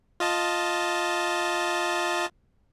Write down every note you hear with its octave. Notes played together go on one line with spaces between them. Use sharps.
F4 D#5 A5